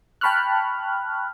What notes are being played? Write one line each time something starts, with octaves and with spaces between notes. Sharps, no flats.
G5 A5 B5 C#6 F6 F#6